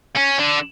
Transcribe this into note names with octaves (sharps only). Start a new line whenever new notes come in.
C#4
D3